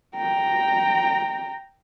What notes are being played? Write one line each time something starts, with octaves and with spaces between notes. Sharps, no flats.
G5 A#5